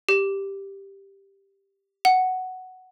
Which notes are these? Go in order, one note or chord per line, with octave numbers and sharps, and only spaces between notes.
G4
F#5